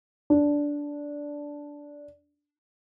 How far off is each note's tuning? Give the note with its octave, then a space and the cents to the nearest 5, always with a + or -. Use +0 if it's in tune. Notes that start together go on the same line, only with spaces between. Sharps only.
D4 -10